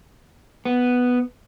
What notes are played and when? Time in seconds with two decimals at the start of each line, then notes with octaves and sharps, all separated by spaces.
0.65 B3